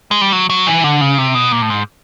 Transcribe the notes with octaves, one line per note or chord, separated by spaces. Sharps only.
G#3
G3
F#3
F#3
E3
D3
C#3
C3
B2
A#2
A2
G#2